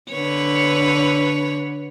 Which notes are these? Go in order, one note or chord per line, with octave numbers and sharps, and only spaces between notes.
D3 B4 C#5